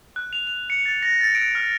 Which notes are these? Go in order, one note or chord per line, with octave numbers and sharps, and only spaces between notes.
F#6
F7
F7
C#7
A6
A#6
A6
D7
F6